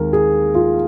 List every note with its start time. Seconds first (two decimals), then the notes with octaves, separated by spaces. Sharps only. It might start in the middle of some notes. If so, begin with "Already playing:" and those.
Already playing: D#2 D#3 G#3 C4 A#4
0.13 G#4
0.55 F4